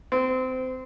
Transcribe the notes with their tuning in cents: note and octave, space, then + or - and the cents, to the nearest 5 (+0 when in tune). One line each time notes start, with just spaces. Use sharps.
C4 -25